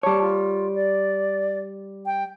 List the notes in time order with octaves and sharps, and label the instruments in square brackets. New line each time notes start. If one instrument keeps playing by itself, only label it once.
[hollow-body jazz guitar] G3 C#5 [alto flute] A5
[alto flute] F4
D5
G5